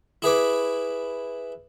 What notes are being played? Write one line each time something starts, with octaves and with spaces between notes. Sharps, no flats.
E4 G#4 B4 D6